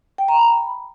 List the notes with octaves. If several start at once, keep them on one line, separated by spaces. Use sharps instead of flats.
G5
A#5
B5